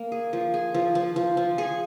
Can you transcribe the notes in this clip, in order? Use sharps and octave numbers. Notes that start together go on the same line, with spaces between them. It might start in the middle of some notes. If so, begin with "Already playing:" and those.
Already playing: A#3
G#4
F3
G#4
F3
F3
F3
F3
G#4